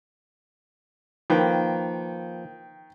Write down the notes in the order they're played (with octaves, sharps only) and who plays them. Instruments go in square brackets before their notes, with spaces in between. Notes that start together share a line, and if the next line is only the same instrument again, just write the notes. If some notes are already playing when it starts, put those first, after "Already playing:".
[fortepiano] D#3 G5 [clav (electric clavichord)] F3 A#3 B4